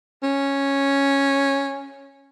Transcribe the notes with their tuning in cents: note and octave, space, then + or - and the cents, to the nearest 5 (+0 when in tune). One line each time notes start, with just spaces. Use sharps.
C#4 -5